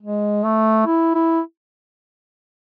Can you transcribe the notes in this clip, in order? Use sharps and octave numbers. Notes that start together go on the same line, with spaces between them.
G#3
A3
E4
E4